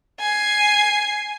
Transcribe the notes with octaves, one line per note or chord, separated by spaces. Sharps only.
G#5 C7